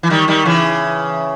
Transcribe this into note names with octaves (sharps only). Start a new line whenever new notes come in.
E3
D#3 G3
D#3 G3
C#3 E3